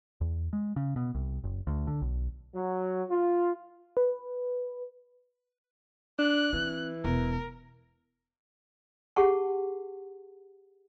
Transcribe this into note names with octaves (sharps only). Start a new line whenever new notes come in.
E2
G#3
C#3
B2
C2
F#1
D2
D3
B1
F#3
F4
B4
D4 F#6
E3 C4
E1 A#4
G4 G#4 F#5 A5 C6 C#6